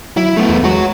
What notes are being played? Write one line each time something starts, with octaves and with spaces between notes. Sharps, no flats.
F#3 E4
A3 B3
E2
G#3 F#4 C#5